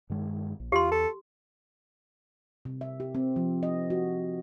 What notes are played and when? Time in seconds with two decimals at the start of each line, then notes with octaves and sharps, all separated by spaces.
0.10 G2 D#3 G#3
0.60 A#1
0.72 E2 F4 G4 C6
0.92 A4
2.65 C3
2.81 E5
3.00 G4
3.15 C4
3.36 F3
3.63 D#5
3.90 F#4